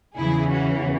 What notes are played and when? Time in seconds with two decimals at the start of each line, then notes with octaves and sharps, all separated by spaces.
0.17 E2 C#3 E3 E4 G#4
0.52 C#4 F#4